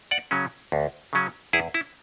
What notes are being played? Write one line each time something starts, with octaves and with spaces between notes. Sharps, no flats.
D5 F#5
C#3 F#3 C#4
D2
C#3 F#3 C#4
E2 E4 G#4
E4